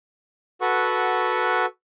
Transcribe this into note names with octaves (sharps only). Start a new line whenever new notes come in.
F#4 A4 B4 F#5 C#6